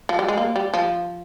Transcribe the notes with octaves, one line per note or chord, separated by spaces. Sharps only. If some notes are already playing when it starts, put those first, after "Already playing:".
F3
G3
G#3
A#3
G3
F3